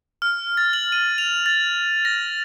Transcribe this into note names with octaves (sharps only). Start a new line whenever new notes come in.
F6
A6
F#7
D#7
F7
A6
A#6